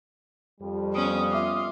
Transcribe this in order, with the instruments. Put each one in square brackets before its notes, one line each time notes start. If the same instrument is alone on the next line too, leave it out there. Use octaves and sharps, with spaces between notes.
[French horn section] F2 G3
[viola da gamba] B3 C#4 [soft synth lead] D#6
[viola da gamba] F4 [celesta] E5 D6